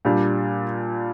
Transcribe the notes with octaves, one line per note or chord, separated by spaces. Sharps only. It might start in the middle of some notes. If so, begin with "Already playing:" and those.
A#2 G3 D4